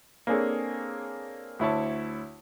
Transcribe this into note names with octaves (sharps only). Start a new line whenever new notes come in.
A#3 C4 D4 G#4 A4 C#5
D2 E4 C#5 A5